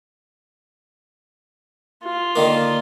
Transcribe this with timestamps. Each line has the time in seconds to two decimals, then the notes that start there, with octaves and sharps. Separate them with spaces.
2.04 F4
2.36 D3 D#3 A#3